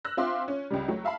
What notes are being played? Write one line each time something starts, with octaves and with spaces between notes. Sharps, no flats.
E6 F#6 A#6
C4 F4 E5 C6 D6
C#4
C#2 C#3 G3
F#3 A3
E5 F5 A5 B5